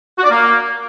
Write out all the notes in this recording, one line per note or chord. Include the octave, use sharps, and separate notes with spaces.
F#4
D5
A#3